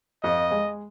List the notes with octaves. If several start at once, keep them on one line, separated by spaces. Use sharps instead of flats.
F2 D#5
G#3